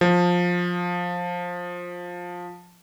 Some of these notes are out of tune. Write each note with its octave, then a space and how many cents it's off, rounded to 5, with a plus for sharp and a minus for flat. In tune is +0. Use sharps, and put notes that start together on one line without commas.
F3 +15